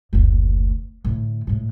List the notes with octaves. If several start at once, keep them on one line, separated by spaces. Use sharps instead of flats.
F#1 D2
A2 D3
A2 G#3